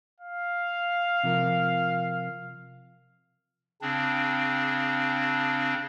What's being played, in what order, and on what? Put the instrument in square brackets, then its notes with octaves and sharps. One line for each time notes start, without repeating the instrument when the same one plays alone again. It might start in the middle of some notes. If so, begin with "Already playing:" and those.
[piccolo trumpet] F5
[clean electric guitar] C3 F3 A#4
[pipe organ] C#3 C4 D4